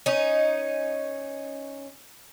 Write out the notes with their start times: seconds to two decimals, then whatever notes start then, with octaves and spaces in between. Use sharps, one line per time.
0.06 C#4 D#4